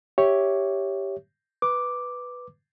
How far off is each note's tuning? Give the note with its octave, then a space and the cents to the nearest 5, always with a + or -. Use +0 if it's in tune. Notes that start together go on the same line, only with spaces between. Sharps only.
G4 +0 C#5 +0 E5 +0
B4 +0 D6 +0